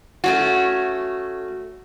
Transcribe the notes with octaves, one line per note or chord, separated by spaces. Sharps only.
A3 C#4 F#4